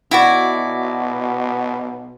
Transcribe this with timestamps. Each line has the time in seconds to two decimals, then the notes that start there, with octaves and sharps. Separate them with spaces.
0.11 B2 E4 F#4 D5